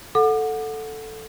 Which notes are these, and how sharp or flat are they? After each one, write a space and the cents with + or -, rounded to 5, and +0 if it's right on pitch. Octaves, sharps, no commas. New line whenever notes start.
A4 +0 F#5 -20 D6 +35